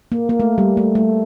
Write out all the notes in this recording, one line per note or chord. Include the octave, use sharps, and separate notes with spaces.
A#3
A#3
A3
G3
A3
A3